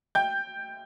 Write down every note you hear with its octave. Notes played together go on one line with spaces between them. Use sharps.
G5 G6